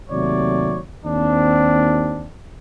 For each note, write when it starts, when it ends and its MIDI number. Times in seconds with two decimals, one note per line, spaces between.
0.10 0.78 39
0.10 0.78 48
0.10 0.78 54
0.10 0.78 57
0.10 0.78 73
0.10 0.78 74
1.05 2.28 39
1.05 2.28 60
1.05 2.28 62